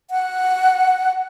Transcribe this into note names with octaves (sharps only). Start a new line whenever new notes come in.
F#5